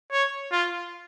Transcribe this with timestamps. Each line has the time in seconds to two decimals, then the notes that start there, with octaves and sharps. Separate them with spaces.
0.12 C#5
0.52 F4